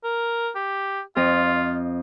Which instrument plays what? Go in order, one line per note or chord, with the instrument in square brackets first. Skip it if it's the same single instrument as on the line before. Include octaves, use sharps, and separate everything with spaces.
[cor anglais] A#4
G4
[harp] F2 D#5 [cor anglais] F4